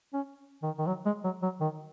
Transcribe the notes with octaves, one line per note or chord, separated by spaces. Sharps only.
C#4
D#3
D#3
F#3
G#3
F#3
F#3
D#3